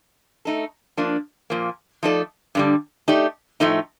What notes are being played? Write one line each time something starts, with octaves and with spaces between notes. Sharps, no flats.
A3 D#4 A4
F3 A#3 D4
A#2 F3 A#3
F3 A3 D#4 A4 D5
G2 D3 G3
A3 D#4 G4 D5
A2 F3 A3 D#4